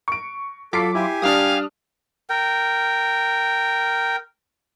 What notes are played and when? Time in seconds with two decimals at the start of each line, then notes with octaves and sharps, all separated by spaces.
0.08 C#6 D7
0.73 F#3 F4 A4 D6 B6 C7
0.95 E4 G4 G#5
1.22 G3 D4 F5 D#6 F6
2.30 A#4 G5